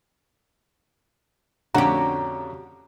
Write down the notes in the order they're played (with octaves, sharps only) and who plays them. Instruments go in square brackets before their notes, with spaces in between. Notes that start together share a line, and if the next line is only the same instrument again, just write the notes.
[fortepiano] F2 D3 C#4 [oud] F#4 G4 [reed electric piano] A#5